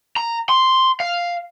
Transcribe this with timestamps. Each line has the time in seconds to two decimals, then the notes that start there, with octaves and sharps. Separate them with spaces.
0.16 A#5
0.49 C6
1.00 F5